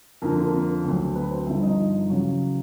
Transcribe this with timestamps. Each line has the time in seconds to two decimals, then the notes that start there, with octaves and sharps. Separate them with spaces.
0.22 F2 D3 F3 A#3 A#4
0.37 A#3 A#4
0.53 A#3 A#4
0.84 D2 D3 F#3
1.16 B3 B4
1.31 C4 C5
1.46 G1 G2 D3 F3 E4 E5
1.63 D#4 D#5
2.09 E2 C#3 F#3 C#4 C#5